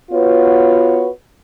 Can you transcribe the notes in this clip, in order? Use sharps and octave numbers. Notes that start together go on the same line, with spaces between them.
B3 F4 F#4 B4 C#5